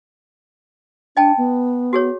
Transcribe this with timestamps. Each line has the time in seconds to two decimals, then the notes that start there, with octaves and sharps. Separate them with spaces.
1.17 D4 D#5 G5 A5
1.37 B3
1.93 F#4 G#4 C#5